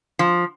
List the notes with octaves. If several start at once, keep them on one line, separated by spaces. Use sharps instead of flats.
F3